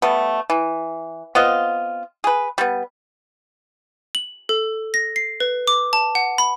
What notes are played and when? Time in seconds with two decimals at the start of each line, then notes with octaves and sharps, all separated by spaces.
0.02 G3 A3 B3
0.50 E3
1.35 B3 C4 F4 D#5
2.24 G#4 B4
2.58 G3 B3
4.15 F#7
4.49 A4
4.94 A#6
5.16 C7
5.40 B4
5.68 D6
5.93 A5
6.15 F#5
6.38 B5